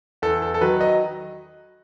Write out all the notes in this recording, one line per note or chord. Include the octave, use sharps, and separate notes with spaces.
E2 A4
A4
A4
D#3 F#3 B4
D#5